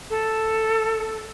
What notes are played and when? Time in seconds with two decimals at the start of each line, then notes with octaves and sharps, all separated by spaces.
0.10 A4